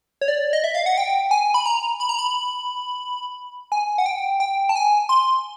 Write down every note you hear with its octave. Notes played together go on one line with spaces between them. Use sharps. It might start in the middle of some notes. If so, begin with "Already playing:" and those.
C#5
D5
D#5
E5
F5
F#5
G5
G#5
B5
A#5
B5
A#5
B5
G#5
F#5
G5
G5
A5
G#5
C6